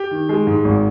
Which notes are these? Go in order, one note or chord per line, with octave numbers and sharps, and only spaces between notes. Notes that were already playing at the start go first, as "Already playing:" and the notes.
Already playing: G4
D#3
G#3
G#2
G#1